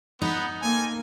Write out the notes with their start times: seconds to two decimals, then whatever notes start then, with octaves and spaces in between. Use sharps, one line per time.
0.22 B3 D#4
0.62 A#3 C4 A4 G#5